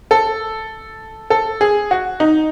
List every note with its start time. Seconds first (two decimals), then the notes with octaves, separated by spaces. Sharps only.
0.11 A4
1.30 A4
1.61 G#4
1.91 F#4
2.20 D#4